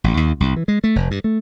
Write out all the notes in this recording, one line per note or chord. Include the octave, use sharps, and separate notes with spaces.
A1
D#2
C2
E3
G#3
A3
F1
G2
A3